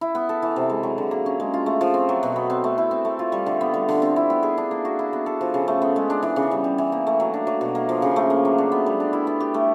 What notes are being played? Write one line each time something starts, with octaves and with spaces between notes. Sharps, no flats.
E4
B3
A4
E3
C3
G#3
F#3
D3
A#3
C#4
G#3
F4
A3
F3
C4
F#3
B2
B3
C4
A3
E4
C4
A3
F4
G3
D3
B3
G3
D3
C4
E4
B3
G#4
D4
A#3
F#4
E4
B3
A4
F3
C#3
A3
B3
G#3
D4
E3
C#3
G3
G3
E3
A#3
A3
F#3
D4
F#3
B2
A#3
F3
C#3
A3
A#3
F#3
D4
B3
G3
D4
E4
B3
G4
A3